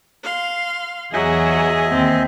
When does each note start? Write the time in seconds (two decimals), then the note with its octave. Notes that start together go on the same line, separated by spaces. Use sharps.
0.23 F5 C6
1.13 E2 F#3 G#4 D#5 E5 G#5
1.92 D#2 C4